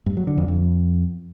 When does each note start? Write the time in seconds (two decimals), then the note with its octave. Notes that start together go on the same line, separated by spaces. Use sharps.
0.06 G2
0.17 F#3
0.27 D3
0.38 F2
0.48 F2